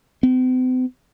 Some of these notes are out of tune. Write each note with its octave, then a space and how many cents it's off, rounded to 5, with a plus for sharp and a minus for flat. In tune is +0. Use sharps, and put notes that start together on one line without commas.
C4 -45